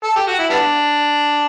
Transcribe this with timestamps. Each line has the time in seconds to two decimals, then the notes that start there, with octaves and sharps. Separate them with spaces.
0.03 A4
0.16 G4
0.27 F#4
0.39 E4
0.50 G3 B3 D4